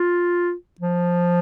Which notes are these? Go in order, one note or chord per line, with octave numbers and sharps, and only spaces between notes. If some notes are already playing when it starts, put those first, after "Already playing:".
Already playing: F4
F3